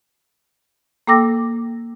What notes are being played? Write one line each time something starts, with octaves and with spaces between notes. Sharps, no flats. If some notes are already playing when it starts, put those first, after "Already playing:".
A#3 A4 G5 D6 E6 A#6